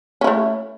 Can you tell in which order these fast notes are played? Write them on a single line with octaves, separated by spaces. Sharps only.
C#4 E4 A3